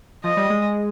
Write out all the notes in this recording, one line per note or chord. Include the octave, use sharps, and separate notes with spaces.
F3 D#5
G3
G#3